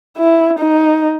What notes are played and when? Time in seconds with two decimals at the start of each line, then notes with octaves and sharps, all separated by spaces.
0.18 E4
0.59 D#4